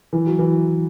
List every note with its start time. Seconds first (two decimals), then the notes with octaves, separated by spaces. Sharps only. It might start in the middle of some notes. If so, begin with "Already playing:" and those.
0.13 E3
0.27 F#3
0.39 E3